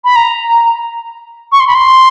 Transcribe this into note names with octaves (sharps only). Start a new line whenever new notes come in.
B5
A#5
C#6
C6
B5
C6